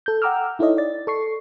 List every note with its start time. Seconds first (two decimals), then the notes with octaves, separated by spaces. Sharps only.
0.06 A4 G6
0.22 F#5 G5 A#5 D6 E6 F6
0.59 D#4 E4 A4 C#5 D#5
0.77 D5 A6
1.07 A4 C#6 C7